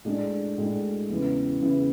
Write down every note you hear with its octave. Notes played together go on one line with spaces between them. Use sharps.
A2 G#3 D4
A2 G#3 D4
E2 C#3 E3
E2 C#3 E3